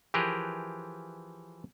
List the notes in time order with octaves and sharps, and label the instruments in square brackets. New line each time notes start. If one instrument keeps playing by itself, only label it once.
[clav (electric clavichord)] E3 F3 G4 G#4 A#4 B4